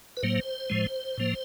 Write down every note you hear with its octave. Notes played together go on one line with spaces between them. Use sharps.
B4
A2 F#3 A#3 C5
A2 F3 G#3
A2 F3 A#3